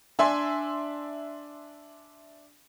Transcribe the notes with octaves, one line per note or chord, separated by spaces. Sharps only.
D4 E5 G#5 C6